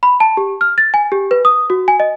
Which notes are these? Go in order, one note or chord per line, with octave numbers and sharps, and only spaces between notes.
B5
A5
G4
F6
A6
G#5
G4
B4
D#6
F#4
G#5
D#5